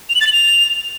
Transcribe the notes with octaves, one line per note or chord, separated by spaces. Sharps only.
F7
F#7
A6
F#7
F7